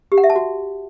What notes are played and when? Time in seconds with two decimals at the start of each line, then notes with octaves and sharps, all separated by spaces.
0.12 G4
0.18 F#5
0.24 E5
0.30 A5
0.36 F#4